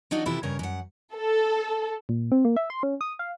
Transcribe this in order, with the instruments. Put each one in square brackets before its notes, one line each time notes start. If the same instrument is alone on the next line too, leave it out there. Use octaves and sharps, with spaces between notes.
[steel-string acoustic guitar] F#3 D4 D#4 F4 F#4
C3 E3 E4 F4 G4 A4
G2 C#3 A#4 C#5
F#2 F#5
[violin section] A4
[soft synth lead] A#2
C4
A#3
E5
C6
C#4
D#6
F5